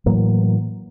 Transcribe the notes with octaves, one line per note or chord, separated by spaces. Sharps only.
A2 E3 F#3 A#3